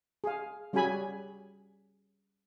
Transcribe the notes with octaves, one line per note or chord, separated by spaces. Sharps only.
G#4 F5
G3 C#4 F#4 G#4 G#5 B5